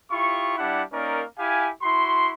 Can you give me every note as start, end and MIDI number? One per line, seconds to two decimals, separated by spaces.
0.11 0.56 64
0.11 0.56 65
0.11 0.56 67
0.11 0.56 85
0.58 0.82 55
0.58 0.82 62
0.58 0.82 64
0.58 0.82 67
0.58 0.82 78
0.92 1.23 58
0.92 1.23 61
0.92 1.23 63
0.92 1.23 70
0.92 1.23 74
1.38 1.70 64
1.38 1.70 67
1.38 1.70 77
1.38 1.70 80
1.82 2.32 64
1.82 2.32 66
1.82 2.32 84